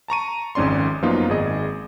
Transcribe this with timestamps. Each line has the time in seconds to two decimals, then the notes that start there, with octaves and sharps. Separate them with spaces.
0.08 A5 A#5 C#6 D#7
0.55 G#1 F2 G#2 C#4 D5 C6
1.02 F#2 F3 A#3 B3 D#4 F4
1.29 G#1 G#4 D#5